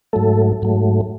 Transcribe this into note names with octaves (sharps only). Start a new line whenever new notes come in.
G#2 F#3 A3 A4
G#2 F#3 A3